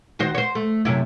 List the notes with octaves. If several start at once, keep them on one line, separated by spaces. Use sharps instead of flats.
D#3 F#4 C5
C5 C#5
A3
F#2 C3 E4